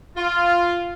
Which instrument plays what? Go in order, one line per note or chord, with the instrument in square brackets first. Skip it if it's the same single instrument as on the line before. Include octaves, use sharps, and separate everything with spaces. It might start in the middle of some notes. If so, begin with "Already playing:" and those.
[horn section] F4